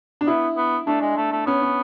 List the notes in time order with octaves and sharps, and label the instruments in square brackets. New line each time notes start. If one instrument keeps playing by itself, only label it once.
[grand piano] D4
[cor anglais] B3 [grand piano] E4
[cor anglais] B3
[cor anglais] A3 [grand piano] D4
[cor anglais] G#3
A3
A3
[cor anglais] B3 [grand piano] C#4
[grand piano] C#4